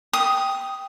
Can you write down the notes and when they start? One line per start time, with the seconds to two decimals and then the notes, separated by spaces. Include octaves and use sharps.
0.13 G5 D#6